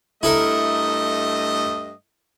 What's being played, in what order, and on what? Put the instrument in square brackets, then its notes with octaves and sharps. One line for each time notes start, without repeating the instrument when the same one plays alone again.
[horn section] G2 A3 D#5 [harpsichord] E4 A4 A#4